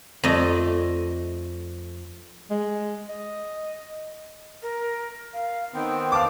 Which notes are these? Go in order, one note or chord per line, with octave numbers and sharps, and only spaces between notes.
F2 A3 D5 D#5
G#3
D#5
A#4
F5
D#3 B3 C4 G5
F5 A5 D6